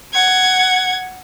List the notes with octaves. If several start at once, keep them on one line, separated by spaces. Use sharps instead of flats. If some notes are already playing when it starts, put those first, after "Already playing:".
F#5 G#6